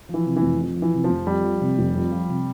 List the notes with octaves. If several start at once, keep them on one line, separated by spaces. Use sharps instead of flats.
E3 F3
C3
E3
F1
F2
F3
E3
C3
F3
F1
F2 G3
F3
C3
F1
F2
F3
C3